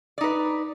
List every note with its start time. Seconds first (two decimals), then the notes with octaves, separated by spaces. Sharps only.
0.18 D5
0.21 D#4
0.24 B4